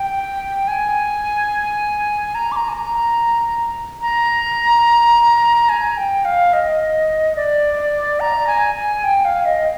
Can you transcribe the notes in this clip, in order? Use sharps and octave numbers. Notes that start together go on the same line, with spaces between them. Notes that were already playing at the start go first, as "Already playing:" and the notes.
Already playing: G5
G#5
A#5
D6
A#5
G#5
A#5
A#5
G#5
G5
F5
D#5
D5
A#5
G#5
G#5
G5
F5
D#5